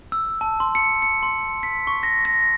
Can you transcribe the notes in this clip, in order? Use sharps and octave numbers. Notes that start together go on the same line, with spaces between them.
E6
A5
C6
C#7
C#7
C6
B6
C#6
A#6
A#6